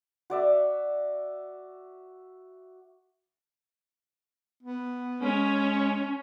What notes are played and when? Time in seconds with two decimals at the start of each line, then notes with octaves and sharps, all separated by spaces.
0.30 F#4 D5 E5
4.63 B3
5.23 G#3 C#4